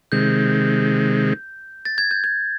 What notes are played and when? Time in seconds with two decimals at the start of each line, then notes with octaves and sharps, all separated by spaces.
0.12 C3 D#3 G#3 G6
1.85 A6
1.98 G#6
2.11 G6
2.24 G#6